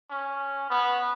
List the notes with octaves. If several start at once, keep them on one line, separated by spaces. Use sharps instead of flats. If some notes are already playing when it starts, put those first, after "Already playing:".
C#4
B3